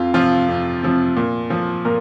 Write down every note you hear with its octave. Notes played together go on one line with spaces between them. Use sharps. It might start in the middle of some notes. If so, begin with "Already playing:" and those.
Already playing: F2 F4
C3 F3 F4
F2
C3 F3
A#2
F3
A#2 A#4